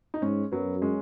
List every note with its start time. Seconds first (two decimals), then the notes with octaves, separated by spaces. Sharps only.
0.14 D#4
0.22 G#2 G#3 C#4
0.52 F#2 F#3 B3
0.82 G#3 C#4